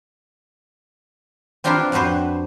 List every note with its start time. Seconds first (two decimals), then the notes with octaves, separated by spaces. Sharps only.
1.64 C4 D4 F4 G4 A#4 B4
1.92 F2 D4 F#4 B4 C5